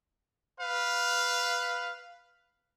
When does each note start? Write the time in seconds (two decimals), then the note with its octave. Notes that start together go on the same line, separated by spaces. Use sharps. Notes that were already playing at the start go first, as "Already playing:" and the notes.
0.60 B4 F5